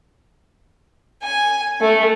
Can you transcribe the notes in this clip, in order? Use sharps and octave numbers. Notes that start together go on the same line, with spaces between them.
G#5
A3